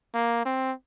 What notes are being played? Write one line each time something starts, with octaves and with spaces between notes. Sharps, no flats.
A#3
C4